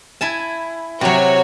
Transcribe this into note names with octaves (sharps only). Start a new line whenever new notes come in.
E4 G#5 A5
C3 F#3 F#4 C#5